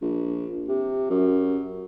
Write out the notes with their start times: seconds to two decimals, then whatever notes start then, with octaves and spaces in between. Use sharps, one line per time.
0.02 A#1
0.68 C3
1.10 F#2